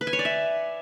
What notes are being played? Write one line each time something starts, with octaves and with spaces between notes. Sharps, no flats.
B4
G#5
C#5
D5
E5